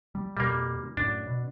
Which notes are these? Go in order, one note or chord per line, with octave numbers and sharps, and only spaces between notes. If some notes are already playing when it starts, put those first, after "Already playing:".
G3
F2 B2 G3 A#3
F#2 A2 D4
B2